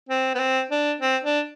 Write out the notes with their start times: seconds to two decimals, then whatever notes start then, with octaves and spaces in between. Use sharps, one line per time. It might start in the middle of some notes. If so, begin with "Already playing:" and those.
0.09 C4
0.35 B3
0.40 C4
0.71 D4
1.01 C4
1.24 D4